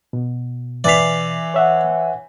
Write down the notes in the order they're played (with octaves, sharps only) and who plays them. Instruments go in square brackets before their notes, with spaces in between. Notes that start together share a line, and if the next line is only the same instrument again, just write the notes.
[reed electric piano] B2
[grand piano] E3 B6 [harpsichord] D5 F5
[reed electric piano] C#5 E5 F#5